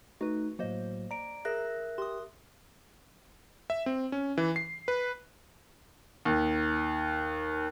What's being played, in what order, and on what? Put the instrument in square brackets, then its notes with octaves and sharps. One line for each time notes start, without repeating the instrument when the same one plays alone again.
[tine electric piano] A3 D#4 [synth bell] F#4 B4
[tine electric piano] A2 F#3 [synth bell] A#3 C5 D#5
[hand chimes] D5 D7 [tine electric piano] A#5
[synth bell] G#4 A#6 [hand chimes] A#4 E5 F#6
[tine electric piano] G4 [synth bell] C6 D#6
[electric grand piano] E5
C4
C#4
E3
C7
B4
[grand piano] D#2